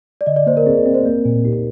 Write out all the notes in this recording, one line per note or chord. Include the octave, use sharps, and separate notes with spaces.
D5
D3 D#5
D5
A#3 C5
A#4
C4 G#4
C4
C5
A#3 A#4
A#2
D#4 G4